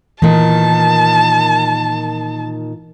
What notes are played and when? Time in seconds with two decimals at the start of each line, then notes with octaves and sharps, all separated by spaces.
0.22 A#2 D#3 E3 A5